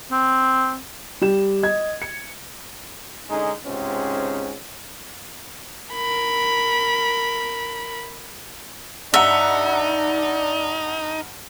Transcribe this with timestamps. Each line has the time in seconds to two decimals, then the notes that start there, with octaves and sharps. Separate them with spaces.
0.11 C4
1.21 G3 G4 E7
1.63 D#5 G#6
2.02 C#7
3.29 D3 G#3 C#4 D#4
3.65 C#2 G#2 C3 C4 C#4
5.94 A#4 B5
9.14 G2 D#4 D5 E5 F#5 A#5